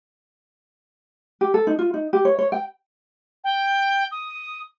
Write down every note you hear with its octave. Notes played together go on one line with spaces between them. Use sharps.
G4
A4
D#4
F4
D#4
G4
C#5
C#5
G5
G5
D#6